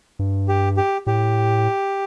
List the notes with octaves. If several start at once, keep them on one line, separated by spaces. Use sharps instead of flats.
G2
G4
G4
A2 G4